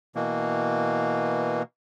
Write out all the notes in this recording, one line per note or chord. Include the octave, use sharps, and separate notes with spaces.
B2 E3 A#3